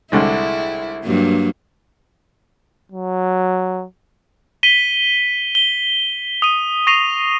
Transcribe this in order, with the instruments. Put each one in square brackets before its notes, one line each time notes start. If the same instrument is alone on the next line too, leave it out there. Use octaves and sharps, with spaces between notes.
[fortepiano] C2 D3 G#3 [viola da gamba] E4
[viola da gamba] G2 F#3 A#3
[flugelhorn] F#3
[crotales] B6 D#7 G7
G7
D#6 D#7
C#6 A#6 C7 D#7 F7